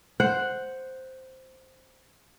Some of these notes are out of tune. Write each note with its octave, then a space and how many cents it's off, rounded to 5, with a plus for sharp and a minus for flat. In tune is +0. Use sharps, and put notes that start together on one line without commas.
C5 +0 F#5 +0